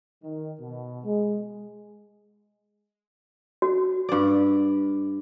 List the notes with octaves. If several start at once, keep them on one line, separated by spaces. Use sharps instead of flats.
D#3
B2
G#3
F#4
G2 D5